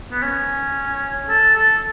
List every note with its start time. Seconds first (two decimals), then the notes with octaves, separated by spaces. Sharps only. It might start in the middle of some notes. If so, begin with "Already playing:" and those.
0.11 B3
0.22 C#4
1.29 A4
1.55 A4